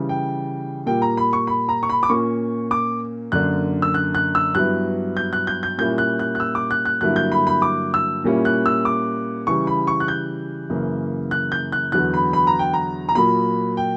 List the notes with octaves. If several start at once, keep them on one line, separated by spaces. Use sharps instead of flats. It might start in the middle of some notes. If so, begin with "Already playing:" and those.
Already playing: C#3 E3 G3
G5
A#2 G3 A#3 G5
A#5
B5
C#6
B5
A#5
C#6
B5
D6
A#2 A#3 C#4 C#6
D6
F#2 D3 A#3 D4 F#6
E6
F#6
F#6
E6
G2 F#3 B3 E4 F#6
G6
F#6
G6
G6
A#2 G3 A#3 C#4 E4 G6
F#6
F#6
F#6
E6
D6
F#6
F#6
G2 D3 F#3 A#3 E4 F#6
G6
B5
B5
D6
E6
A#2 G3 A#3 C#4 E4
F#6
E6
D6
C#3 E3 G3 C#6
B5
C#6
F#6
G6
F#2 C#3 E3 A#3
F#6
G6
F#6
E2 D3 F#3 B3 F#6
B5
B5
A#5
G5
A#5
A#5
A#2 F#3 A#3 B5
G5